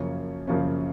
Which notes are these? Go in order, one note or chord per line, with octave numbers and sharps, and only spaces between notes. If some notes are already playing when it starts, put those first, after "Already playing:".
Already playing: F#2 C#3 F3 A#3 C#4 C#5
F#2 C#3 F3 A#3 C#4